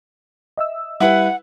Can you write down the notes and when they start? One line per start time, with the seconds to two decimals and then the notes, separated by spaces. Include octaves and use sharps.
0.58 D#5 E5 E6
1.00 G3 E4 G4 B4 F#5